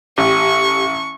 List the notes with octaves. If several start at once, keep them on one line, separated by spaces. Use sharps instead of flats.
A1 G4 C#6